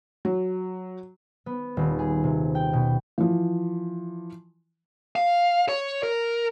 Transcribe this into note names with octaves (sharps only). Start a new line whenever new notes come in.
F#3
B3
D#1
G#4
C3
G5
B2
E3 F3
F5
C#5
A#4